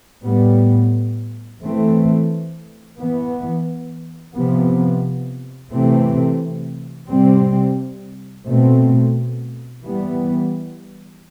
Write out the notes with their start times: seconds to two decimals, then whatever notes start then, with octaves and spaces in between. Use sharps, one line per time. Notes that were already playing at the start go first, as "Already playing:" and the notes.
0.24 A2 G3 B3
1.62 E3 A3 C4
2.99 E3 B3
4.35 C3 F3 B3
5.72 C3 E3 A3 C4
7.09 C3 G3 C4
8.47 B2 A3 C4
9.84 E3 G3 B3